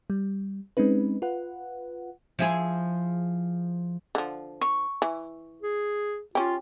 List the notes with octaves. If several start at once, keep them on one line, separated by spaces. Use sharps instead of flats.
G3
G#3 C4 C#4 D#4 B4
F4 B4 F#5
F3 E4 G#4
D3 F3
C#6
E3
G#4
C#4 F4 G4